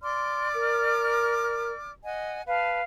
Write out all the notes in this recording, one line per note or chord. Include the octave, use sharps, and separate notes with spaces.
D5 C6 D6 F6
A#4
D#5 F#5 G#5
B4 F5 A5